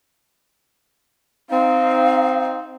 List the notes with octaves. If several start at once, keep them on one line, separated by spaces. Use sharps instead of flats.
C4 D#4 F5